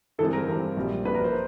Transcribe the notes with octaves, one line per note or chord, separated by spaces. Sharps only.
G2 E3 G#3 C4 A4
A#4
G2 E3 G#3 C4
A#1 A#2 G3
A#1 A#2 G3 B4
A#4
C5